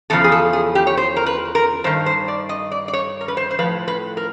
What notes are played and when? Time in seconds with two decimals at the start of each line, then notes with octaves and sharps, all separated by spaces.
0.10 E2 C#3 F3 A4
0.24 G#4
0.32 A4
0.53 G#4
0.75 G4
0.87 C#5
0.97 C5
1.16 A#4
1.26 B4
1.55 A#4
1.84 G2 D#3 C5
2.06 C5
2.28 D5
2.49 D#5
2.71 D5
2.88 D5
2.93 C#5
3.21 A#4
3.28 B4
3.37 C5
3.51 C5
3.59 A2 F3 B4
3.88 B4
4.17 A#4